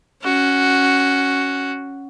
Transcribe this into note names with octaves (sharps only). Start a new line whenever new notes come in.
C#4 F#4